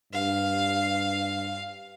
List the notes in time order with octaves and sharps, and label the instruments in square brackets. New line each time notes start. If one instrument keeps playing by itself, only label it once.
[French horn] G2 [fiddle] F5